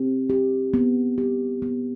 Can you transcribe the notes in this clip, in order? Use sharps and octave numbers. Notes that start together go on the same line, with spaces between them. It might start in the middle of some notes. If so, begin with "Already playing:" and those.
Already playing: C4 G4
G4
B3
G4
B3